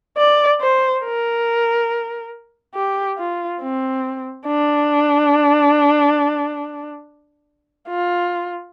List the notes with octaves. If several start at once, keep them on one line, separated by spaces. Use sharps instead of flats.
D5
C5
A#4
G4
F4
C4
D4
F4